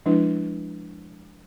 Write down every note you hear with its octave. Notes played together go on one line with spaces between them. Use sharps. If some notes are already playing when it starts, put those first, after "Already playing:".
F3 G#3 D4 E4 B4